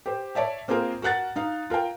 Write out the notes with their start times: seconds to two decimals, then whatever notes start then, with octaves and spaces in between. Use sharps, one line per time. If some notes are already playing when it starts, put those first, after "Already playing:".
0.06 G4 C5
0.35 C#5 D5 E5 A5
0.68 A#3 C4 F4 G#4 A#4 C5
1.02 F#4 A#4 F#5 F#6 A6
1.36 D#4 F5
1.70 F4 A#4 F5 G5